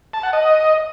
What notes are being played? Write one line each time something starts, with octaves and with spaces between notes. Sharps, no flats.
A5
F#5
D#5